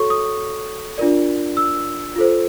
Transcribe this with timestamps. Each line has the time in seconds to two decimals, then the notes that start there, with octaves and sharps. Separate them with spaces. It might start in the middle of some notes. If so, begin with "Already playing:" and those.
Already playing: F#4 A4 C#5 C#6
0.10 D#6
0.98 D4 F4 A#4 D5
1.57 E6
2.16 F4 A4 C5